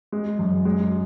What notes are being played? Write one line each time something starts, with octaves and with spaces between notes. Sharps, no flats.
G#3
F#2
G#3